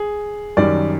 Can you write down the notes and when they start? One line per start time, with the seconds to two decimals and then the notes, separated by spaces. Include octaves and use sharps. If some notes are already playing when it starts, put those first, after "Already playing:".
Already playing: G#4
0.57 F#2 D#3 G3 D5